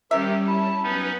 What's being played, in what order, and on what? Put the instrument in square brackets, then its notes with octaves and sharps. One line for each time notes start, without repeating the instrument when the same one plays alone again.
[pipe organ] D#3 G4 [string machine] G3 C#4 [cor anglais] A#4 [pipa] E5
[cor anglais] E4 [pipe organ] A5
[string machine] F#2 B4 [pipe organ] B3 C#4 D#4